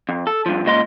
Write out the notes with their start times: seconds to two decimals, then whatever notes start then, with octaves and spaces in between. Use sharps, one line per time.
0.09 F2
0.27 A4
0.46 G2 F3
0.65 C#2 A#2 D#5 C6